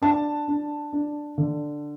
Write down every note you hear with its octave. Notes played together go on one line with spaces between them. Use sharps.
D4 A5
D4
D4
D3